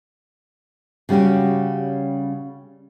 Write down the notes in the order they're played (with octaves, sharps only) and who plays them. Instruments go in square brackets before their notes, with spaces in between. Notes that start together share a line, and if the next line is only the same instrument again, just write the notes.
[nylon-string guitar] C#3 G3 C#4 F#4 G4